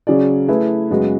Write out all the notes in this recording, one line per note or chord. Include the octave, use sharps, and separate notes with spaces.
C#3 F#3 C#4 G#4 D5
A3 E4 G#4 B4 E5
F#2 C#3 G#3 B3 F#4